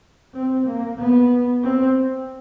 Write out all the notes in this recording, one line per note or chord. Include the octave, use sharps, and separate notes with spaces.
C4
A#3
B3
C4